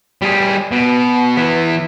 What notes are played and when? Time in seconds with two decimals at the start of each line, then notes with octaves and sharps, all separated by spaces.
0.22 G3 G#4
0.71 B2
1.37 E3 B3